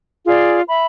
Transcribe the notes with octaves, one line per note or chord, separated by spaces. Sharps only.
F4 G#4 D5
E5 B5